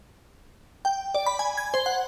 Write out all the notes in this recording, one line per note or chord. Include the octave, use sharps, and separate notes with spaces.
G5
D5
B5
G#5
G#6
C5
F#5